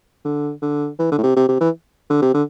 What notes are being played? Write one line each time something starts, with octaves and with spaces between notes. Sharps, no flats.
D3
D3
E3
D3
A2
C3
C3
C3
E3
D3
C3
D3